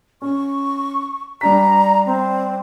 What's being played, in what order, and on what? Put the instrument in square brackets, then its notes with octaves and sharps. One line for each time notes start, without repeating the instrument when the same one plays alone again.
[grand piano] C#4 [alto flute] C#6
[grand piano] G3 D4 B6 [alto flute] A#5
[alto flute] C4